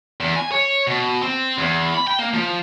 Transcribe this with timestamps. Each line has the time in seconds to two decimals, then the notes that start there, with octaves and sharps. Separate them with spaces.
0.20 E2
0.36 G#5
0.51 C#5
0.87 B2
1.22 C4
1.58 E2
1.94 B5
2.07 G5
2.19 A#3
2.33 F3